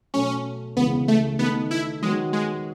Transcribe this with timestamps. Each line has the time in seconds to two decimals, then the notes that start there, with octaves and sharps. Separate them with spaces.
0.14 B2 F#3 A3 C#4
0.76 C#2 C#3 E3 G#3 B3
1.08 A3
1.39 D#3 A3 B3 D#4
1.71 E4
2.02 D#3 F#3 G#3 B3 F#4
2.33 G#3